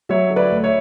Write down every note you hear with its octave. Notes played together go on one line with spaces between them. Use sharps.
F#3 C#5 E5
D3
B4 D5
D2
C#5 E5